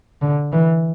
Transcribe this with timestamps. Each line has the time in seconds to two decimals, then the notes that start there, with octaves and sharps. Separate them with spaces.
0.22 D3
0.52 E3